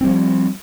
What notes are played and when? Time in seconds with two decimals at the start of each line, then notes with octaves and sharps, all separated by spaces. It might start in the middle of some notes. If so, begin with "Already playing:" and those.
0.01 C4
0.04 G3
0.07 F3